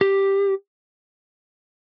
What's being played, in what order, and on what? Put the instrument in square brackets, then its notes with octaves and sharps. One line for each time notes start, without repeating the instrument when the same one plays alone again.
[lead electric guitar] G4